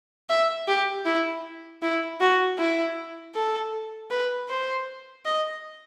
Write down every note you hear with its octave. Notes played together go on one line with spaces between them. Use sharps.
E5
G4
E4
E4
F#4
E4
A4
B4
C5
D#5